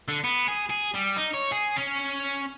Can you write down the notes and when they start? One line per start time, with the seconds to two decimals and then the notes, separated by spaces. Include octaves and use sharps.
0.08 D3
0.24 B3
0.48 G#4
0.70 G#4
0.94 G3
1.16 D#4
1.33 C#5
1.52 G#4
1.76 C#4